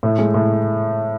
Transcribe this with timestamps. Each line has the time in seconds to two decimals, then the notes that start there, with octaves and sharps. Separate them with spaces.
0.03 A2
0.18 G#3
0.34 A2